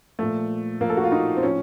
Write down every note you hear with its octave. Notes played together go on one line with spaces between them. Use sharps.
A#2 F3 A3
A#2 F3 A#3
A4
F#4
F4
D#4
C4
A2 F3 C#4